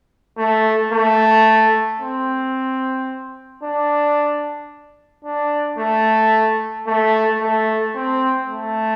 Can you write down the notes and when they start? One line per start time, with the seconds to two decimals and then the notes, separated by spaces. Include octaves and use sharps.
0.38 A3
0.93 A3
2.00 C4
3.63 D4
5.25 D4
5.78 A3
6.87 A3
7.42 A3
7.95 C4
8.50 A3